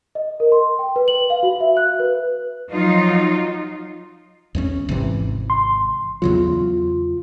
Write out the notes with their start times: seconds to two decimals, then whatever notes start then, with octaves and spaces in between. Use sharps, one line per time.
0.15 D#5
0.40 A#4
0.52 C6
0.79 G5
0.96 B4
1.08 F#7
1.30 F5
1.43 F#4
1.60 E5
1.77 F#6
2.00 B4
2.71 F3 F#3 D#4 F4
4.55 E2 A3 C#4
4.89 G#1 C3 E3
5.50 C6
6.22 E2 C#3 F#3 F4